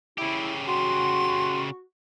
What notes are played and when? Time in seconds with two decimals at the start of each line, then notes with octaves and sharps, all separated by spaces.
0.18 C#3 E4 G4
0.68 F#4 C6